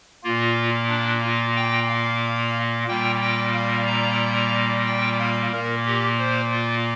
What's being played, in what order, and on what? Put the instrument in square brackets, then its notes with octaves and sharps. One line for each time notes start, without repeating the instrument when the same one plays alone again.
[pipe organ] A#2 A#3 F4
D4
F4
G5
F5
A#2 G3 A#3 G5
G5
F5
A#5
G5
F5
A#2 A#3 A#4
G4
C5
F4